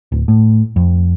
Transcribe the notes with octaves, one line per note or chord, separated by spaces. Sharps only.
D1
A2
F2